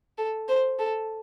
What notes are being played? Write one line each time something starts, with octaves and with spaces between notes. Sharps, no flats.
A4
C5
A4